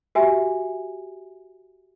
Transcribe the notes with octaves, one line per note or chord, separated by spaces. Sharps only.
F#4 G4 E5 G#5